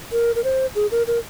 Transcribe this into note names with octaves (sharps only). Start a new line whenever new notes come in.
A#4
A#4
C5
G#4
A#4
A#4